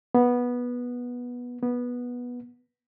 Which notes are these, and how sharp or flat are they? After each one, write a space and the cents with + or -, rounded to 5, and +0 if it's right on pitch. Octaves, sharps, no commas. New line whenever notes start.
B3 -10
B3 -10